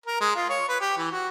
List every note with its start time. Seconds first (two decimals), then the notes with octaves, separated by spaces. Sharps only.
0.06 A#4
0.21 G#3
0.35 F4
0.50 C#5
0.69 B4
0.81 G4
0.97 E3
1.11 F#4